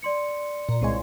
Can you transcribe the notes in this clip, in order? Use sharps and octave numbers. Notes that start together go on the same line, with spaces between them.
D5 C6 C#7
A#2
C2 C#3 G#3